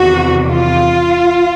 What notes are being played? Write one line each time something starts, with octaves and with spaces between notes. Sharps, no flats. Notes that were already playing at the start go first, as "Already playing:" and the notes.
Already playing: E2 C3 D#3 F#4
F4